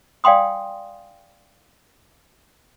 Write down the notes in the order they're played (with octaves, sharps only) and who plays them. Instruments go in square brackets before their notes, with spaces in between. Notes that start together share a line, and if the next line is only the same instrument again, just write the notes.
[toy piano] D5 F5 G5 G#5 C6 D#6